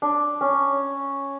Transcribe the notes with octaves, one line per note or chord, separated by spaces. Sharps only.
D4
C#4